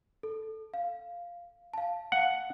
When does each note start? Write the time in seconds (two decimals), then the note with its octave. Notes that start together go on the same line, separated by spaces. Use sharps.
0.23 A4
0.74 F5
1.74 F5 A5
2.12 F5 F#5